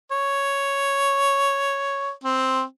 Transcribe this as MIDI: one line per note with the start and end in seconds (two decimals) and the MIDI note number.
0.12 2.11 73
2.23 2.64 60